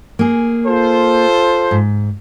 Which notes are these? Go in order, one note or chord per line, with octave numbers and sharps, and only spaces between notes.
A#3 G#4
F4 A4 C5
G#2